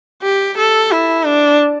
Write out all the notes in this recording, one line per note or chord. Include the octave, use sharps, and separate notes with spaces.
G4
A4
E4
D4